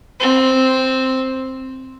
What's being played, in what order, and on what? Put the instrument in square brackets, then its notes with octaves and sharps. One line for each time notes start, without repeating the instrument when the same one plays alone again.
[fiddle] C4